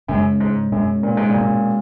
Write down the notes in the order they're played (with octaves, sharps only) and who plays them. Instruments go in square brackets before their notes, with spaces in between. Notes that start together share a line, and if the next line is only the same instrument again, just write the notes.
[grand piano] F#2 [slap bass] C#3 G#3 C#4
[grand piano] G#2
[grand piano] F#2 [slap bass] B2 G#3 C#4
[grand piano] A#2
G#2
A#2
[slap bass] B2 G#3 C#4